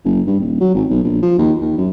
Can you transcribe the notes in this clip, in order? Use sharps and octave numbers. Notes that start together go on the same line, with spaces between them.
F#1
G2
D#1
F#3
G#1
B1
A#1
F3
D#2
D#2
F#2